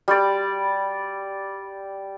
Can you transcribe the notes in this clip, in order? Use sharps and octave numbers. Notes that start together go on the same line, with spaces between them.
G3 D5